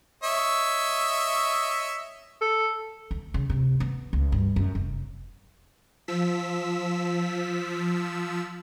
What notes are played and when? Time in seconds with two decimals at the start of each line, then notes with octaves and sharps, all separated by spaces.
0.23 C#5 D#5 E5
2.41 A4
3.11 D2
3.34 C#3
3.50 C3
3.80 B3
4.13 C#2
4.32 G2
4.56 F#2
4.75 F1
6.08 F3 E6 B6